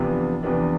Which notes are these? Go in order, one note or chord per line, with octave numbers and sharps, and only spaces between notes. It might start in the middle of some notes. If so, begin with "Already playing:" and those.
Already playing: E2 C3 F3 B3 D4
E2 C3 F3 B3 D4